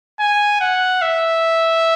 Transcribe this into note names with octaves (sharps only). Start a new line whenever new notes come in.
G#5
F#5
E5